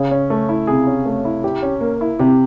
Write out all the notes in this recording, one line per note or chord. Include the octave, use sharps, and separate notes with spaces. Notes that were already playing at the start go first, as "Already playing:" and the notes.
Already playing: C#3 G#4
C#4
A3
E4
C3 G#4
C#4
A3
E4
G4
C#4
A#3
E4
C3 G4